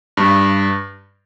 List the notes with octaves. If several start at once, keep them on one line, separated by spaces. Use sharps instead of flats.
G2